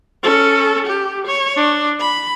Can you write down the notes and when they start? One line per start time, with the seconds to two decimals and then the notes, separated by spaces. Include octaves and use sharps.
0.23 C#4 A4
0.87 G4
1.27 C#5
1.57 D4
2.00 B5